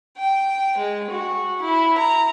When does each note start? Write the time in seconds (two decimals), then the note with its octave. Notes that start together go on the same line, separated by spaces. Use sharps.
0.17 G5
0.77 G#3
1.10 F#4
1.62 E4
1.98 A#5